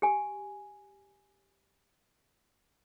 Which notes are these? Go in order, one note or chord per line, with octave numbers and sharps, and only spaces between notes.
G4 G#5